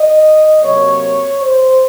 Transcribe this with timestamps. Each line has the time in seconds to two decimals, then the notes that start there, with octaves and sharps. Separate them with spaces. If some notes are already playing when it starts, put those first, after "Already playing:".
Already playing: D#5
0.62 C3 F#3 A#3 C#5
1.41 C5